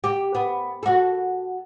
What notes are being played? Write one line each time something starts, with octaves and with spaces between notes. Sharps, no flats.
G4
B3
F#4 A4